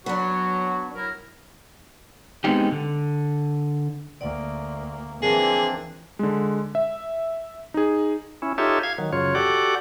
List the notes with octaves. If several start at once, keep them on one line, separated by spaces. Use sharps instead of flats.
F#3 B3 D4 F#4
F#3 E4 A#4
G#3 B3 C4 D#4 G4
D3
D2 A#3 D5 F#5
E3 F3 A#3 C4 D4 G#4 A#4
D3 G#3
E5
D#4 G#4
C#4 E4
D#4 F4 G4 A4 C#5 E5
F5 G#6
D#3 F#3
F#2 C#3 F#3 F4 C#5
F#4 G4 A4 D5 F#5